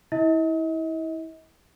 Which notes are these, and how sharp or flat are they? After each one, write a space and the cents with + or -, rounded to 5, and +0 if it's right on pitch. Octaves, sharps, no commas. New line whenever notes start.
E4 -25 D#5 +40